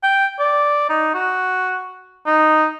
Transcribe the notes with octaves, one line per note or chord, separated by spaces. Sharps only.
G5
D5
D#4
F#4
D#4